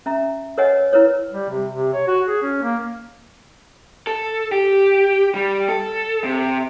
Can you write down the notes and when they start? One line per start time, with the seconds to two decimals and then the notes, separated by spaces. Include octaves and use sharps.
0.06 C#4 E5 A#5
0.58 A#4 B4 C#5 D#5 F#5 G#5
0.93 E4 A#4 B4 C#5
1.32 G3
1.50 C3
1.73 C3
1.94 C#5
2.08 F#4
2.28 G#4
2.43 C#4
2.62 A#3
4.07 A4
4.52 G4
5.35 G3
5.69 A4
6.24 C3